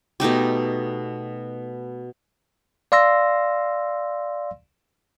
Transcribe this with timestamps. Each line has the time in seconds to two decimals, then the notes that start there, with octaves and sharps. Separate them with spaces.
0.20 B2 A3 D#4 G4
2.92 D5 F5 C6 E6 A#6